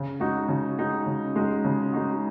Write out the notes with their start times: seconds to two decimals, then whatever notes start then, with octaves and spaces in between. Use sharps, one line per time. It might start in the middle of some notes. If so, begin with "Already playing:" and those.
Already playing: C#3
0.20 G#3 D#4 F#4
0.49 C#3
0.78 G#3 D#4 F#4
1.06 C#3
1.36 G#3 D#4 F#4
1.64 C#3
1.93 G#3 D#4 F#4